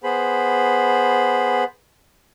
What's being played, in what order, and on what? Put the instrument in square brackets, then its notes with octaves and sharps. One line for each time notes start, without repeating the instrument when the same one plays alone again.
[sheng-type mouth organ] B3 G#4 C5 B5